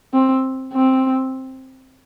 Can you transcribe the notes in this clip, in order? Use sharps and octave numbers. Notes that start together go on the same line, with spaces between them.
C4
C4